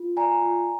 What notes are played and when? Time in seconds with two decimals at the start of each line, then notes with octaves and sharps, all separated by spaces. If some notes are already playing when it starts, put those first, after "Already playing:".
Already playing: F4
0.17 D5 G#5 A#5
0.42 F4